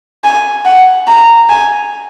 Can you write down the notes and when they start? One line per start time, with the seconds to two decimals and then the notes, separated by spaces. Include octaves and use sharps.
0.24 G#5
0.65 F#5
1.07 A#5
1.49 G#5